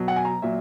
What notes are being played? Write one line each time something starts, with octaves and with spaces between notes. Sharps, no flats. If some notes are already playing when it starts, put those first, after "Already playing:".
Already playing: B2 F#3
F#5
G#5
A#5
A#2 F#3 E5